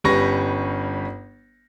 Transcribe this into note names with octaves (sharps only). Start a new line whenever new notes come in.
G1 G3 C#4 B4 C#6 A#6